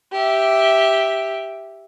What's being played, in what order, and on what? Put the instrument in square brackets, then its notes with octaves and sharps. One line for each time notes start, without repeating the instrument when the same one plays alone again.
[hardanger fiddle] G4 E5